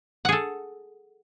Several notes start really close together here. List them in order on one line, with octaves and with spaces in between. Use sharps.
F#5 G#4 A4